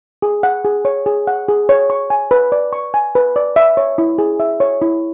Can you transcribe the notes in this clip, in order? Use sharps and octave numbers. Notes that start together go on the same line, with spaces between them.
G#4
F#5
G#4
C#5
G#4
F#5
G#4
C#5
C#6
G#5
B4
D5
C#6
G#5
B4
D5
E5
C#5
E4
G#4
E5
C#5
E4